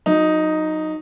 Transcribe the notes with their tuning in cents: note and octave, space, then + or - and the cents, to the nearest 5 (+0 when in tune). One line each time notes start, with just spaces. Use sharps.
F#3 -25 D#4 +0